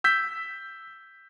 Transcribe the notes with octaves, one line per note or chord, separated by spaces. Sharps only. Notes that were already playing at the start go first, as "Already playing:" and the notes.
E6 G6 B6